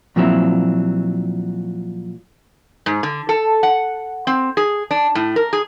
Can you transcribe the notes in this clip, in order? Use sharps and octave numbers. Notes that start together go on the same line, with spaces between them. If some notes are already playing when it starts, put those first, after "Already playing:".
A#2 F3 F#3 C4 E4
G#2
D3
A4
F#5
C4
G#4
D4
A2
A#4
G#4